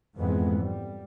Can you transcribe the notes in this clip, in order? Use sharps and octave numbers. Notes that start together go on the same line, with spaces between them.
F2 G#2 E3 G#3 B3
G3